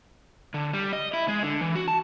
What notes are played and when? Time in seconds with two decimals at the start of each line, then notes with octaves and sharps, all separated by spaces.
0.54 D3
0.73 G3
0.93 D#5
1.13 E4
1.28 G#3
1.43 D3
1.61 E3
1.75 F#4
1.88 A5